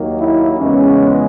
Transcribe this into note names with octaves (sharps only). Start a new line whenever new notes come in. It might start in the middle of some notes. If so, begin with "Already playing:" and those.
Already playing: D#2 D#3 F#3 A#3
E4
E2 C#3 G#3 B3 C#4